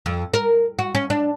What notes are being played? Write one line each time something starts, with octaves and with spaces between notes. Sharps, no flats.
F2
A#4
F#4
C#4
D4